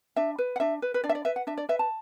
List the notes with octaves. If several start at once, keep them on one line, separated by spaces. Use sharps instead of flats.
D4 E5
B4
F#5
D4 E5
B4
B4
D4 D5
E5
D5
B4 E5
F#5
D4 E5
D5
B4 E5
A5